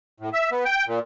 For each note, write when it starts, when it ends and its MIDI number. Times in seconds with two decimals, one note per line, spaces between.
0.20 0.30 45
0.33 0.49 76
0.52 0.64 59
0.65 0.85 79
0.88 0.99 46